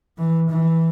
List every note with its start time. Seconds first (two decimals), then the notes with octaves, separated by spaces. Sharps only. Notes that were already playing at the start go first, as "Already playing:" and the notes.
0.18 E3
0.50 E3